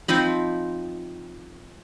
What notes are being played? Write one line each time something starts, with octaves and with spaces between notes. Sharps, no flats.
F3 C4 D#4 B5